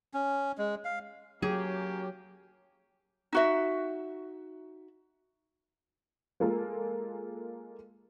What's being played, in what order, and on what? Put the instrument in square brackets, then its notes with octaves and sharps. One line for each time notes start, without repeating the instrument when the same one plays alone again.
[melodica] C#4
G#3
F5
[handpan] F#3 [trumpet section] A#3 C#4 G4 [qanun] G#4
[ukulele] D#4 F#4 E5
[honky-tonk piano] G#3 A#3 F4 A4 A#4